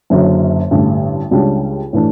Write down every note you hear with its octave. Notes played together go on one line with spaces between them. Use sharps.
F#1 F#2 D3 F#3
A1 G2 D3
C#2 C#3 G3 D4
A2 E3 A3 D4